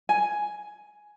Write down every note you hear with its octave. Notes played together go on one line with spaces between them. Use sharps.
G#5